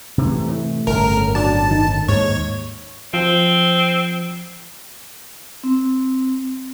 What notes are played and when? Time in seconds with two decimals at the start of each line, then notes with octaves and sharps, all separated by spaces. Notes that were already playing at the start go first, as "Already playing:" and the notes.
0.18 C3 E3 A3
0.48 A2
0.87 G1 A2 C#3 A3 A#4
1.35 F#3 D4 A5
1.71 D#3
2.08 D#2 G#2 C#5
3.14 F3 C4
5.64 C4